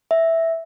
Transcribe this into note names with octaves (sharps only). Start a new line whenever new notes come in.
E5